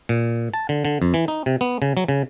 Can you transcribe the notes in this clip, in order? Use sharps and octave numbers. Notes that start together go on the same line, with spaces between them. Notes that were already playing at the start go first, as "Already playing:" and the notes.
A#2
A5
D3
D3
F2
E3
D#4
C3
B3
C#3
F#3
C#3